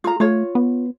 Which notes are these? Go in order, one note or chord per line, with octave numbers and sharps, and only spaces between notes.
F4 A#5
A3 F4 C#5
B3